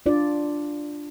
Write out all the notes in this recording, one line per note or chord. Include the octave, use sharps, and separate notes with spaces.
D4 F4 D5